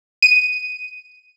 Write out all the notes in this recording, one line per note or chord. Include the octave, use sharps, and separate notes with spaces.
D#7